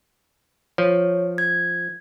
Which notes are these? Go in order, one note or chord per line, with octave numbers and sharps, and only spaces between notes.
F3 C#5
G#6